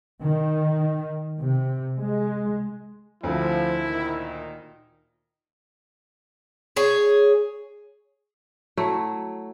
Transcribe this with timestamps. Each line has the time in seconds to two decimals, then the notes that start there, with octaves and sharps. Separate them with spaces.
0.23 D#3
1.39 C3
1.97 G#3
3.23 D2 F3 C4 E4 A4
3.86 A#2 D#3
6.76 G#4 C#5
8.77 F#3 A3 E4